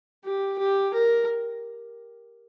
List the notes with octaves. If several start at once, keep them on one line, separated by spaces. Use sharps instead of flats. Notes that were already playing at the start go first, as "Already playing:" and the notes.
G4
G4
A#4